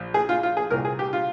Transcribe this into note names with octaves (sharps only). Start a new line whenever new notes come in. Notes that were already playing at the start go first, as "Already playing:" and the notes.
Already playing: A#1
G#4
F4
F4
G#4
C2 A#2 A#4
G#4
G4
F4